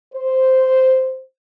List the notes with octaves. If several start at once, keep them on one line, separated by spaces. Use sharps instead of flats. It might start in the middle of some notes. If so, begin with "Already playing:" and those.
C5